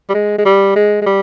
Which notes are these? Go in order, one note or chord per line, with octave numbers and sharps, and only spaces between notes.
G3
G#3
G#3
G3
G#3
G#3
G3